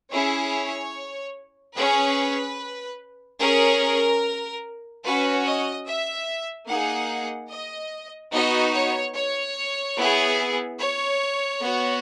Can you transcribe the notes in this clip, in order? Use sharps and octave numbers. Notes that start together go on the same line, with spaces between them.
C#4 E4 G#4 C#5
C#4 G#4 B4
C#4 G#4 A#4
C#4 F#4 B4
D#5
E5
A#3 D#4 G#4 F#5
D#5
B3 D#4 F#4 D#5
C#5
C#5
B3 E4 G#4
C#5
B3 F#4